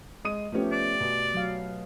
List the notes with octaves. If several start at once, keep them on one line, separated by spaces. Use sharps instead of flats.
G#3 D#6 D#7
F3 A3 B3 C#4 G4
D5
B2
F#3 F5